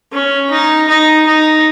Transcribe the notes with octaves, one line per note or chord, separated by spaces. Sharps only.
C#4
D#4
D#4
D#4